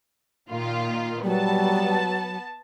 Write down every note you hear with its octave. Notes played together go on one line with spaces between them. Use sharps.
A#2 D#3 F4
F#3 G3 B3 A5